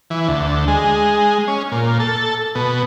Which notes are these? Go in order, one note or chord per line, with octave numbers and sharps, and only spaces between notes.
E3
D2
G#3
C#4
A#2
A4
B2